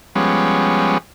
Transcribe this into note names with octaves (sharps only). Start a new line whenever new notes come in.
F3 G3 G#3 B3 C#4